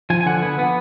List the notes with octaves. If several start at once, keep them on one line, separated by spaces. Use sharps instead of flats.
F3 G#5
G#5
D3 F#5
B3
B3